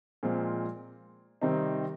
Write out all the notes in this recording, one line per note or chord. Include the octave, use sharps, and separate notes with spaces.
A#2 F3 G#3 C4 F4
C3 D#3 G3 C4 D#4